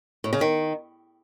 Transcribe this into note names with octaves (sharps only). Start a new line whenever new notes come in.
A2
C#3
D#3